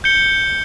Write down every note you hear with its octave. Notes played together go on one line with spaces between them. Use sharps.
G6 C#7 G7